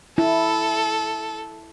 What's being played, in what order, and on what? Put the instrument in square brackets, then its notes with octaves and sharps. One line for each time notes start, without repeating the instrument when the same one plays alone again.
[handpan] E4 [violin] A4